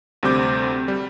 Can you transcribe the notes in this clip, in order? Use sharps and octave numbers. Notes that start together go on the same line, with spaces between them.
D2 C3 G3 C4 D6 G6
G3